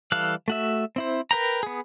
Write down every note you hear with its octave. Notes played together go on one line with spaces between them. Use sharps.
E3 G3 A4 F5 F#6
A3 F#4 E5
C4 E4 C5
A#4 B4 G5 A#5
B3 G#4